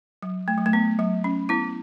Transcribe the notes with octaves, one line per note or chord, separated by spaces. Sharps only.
F#3
A3
F#3
A3
B3
F#3
C#4
B3 E4